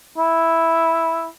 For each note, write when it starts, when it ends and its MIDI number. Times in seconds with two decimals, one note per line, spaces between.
0.18 1.26 64